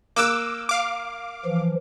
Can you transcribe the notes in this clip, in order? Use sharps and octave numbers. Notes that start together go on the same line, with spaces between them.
A#3 D6 E6 F#6
F5 D6
E3 F3